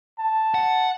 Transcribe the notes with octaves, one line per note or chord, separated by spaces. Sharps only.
A5
F#5